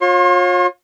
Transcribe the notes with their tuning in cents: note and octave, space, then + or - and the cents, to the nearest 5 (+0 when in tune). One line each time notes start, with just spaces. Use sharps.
F4 +35 C#5 -30 C6 +40